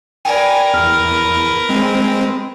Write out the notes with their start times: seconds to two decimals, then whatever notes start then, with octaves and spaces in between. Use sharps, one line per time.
0.25 A#4 B4 D5 G5 G#5
0.74 E2 F6
1.69 G#3 C4